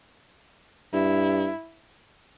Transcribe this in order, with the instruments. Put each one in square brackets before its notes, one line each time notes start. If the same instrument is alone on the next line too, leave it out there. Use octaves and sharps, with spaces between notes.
[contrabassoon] G2 [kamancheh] E4